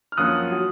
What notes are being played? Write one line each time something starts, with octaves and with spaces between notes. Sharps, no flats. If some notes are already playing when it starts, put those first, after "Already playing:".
F6
F#2 F3 A#3 C#4 F4 D#6 F#6
F#3